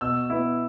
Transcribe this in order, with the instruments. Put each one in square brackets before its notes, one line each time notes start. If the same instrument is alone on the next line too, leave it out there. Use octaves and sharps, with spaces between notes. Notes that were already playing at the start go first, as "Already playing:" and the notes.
[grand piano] B2 E6
B3 E4